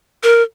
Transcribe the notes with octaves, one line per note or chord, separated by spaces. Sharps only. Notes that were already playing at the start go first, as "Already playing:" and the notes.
A#4